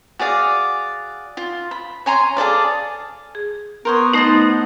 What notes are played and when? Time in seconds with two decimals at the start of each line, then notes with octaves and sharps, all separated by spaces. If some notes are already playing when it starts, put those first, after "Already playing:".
0.19 F#4 G#4 D5 F5
1.37 F4
1.71 B5
2.06 C#5 G#5 A#5 C6
2.37 G#4 A4 D5 F5
3.35 G#4
3.85 B3 A#4 C5 C#5
4.13 A3 D#4 C5 D#5 A5